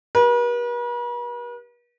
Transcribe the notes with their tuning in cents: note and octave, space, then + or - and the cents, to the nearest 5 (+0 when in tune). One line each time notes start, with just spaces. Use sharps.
G4 +0 B4 -45